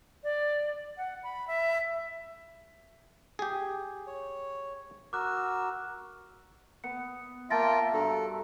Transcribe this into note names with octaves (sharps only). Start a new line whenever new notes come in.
D5
F#5
B5
E5
G4 G#4
C#5
F#4 A#4 D6 E6 F#6
B3 C#7
A#3 F4 E5 G5 A5 B5 A6 A#6
G2 F#4 A4 A#5